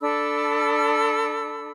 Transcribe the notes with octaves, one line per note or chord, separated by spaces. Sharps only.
D4 A4 B5 E6